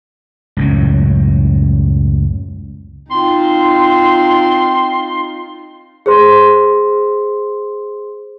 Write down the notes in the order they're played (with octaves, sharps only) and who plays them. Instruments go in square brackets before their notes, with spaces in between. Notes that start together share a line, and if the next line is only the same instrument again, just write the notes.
[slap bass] C#2 F#2 A2
[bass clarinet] C4 [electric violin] D#4 F4 [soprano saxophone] C6
[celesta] G#4 C5 C6